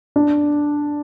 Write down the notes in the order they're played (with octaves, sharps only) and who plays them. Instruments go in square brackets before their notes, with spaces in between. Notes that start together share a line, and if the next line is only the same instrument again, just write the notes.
[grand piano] D4